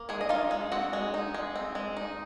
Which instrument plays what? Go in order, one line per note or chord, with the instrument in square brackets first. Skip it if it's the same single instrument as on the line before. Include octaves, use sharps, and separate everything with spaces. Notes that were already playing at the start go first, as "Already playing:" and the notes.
Already playing: [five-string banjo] A#3
D#3 G#3 G#4
D#5
D#4 F4 F5
G#3
C4 F#4 F#5
G#3
D#4
G#3
C4
G#3
D#4